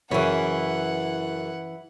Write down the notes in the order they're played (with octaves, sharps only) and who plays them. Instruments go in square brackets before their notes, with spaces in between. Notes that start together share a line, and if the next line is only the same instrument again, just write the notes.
[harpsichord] F#2 C#3 [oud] E3 C#4 [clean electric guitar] E4 [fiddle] F#5